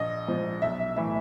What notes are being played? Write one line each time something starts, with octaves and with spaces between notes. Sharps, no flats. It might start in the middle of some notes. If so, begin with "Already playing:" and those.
Already playing: A#1 D#5
G#2 F3
B1 E5
A2 E3 E5